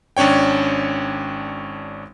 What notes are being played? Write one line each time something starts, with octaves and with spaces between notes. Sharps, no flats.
G#1 C#4 D4 C#5 G5